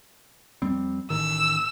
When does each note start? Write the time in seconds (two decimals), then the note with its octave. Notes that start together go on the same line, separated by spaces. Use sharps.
0.62 F2 G3 C4
1.10 A1 D#3 E6